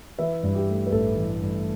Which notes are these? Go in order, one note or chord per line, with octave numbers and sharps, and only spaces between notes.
E3 B4 E5
G2
G4
A3
B4
A1 A4
E3
G2